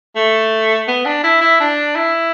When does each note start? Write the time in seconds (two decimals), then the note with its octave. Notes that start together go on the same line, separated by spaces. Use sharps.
0.16 A3
0.88 B3
1.05 D4
1.24 E4
1.41 E4
1.60 D4
1.96 E4